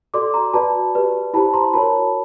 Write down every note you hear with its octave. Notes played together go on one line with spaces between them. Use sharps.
F#4 A4 D5 C6 D6
A#5 C6
F#4 B4 D5 A5 B5
G4 B4 D5
E4 G4 C5 A5 B5
A#5 C6
F#4 A#4 C#5 A5 B5